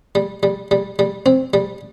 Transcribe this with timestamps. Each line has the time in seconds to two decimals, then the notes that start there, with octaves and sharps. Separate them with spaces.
0.15 G3
0.43 G3
0.71 G3
0.99 G3
1.26 C4
1.54 G3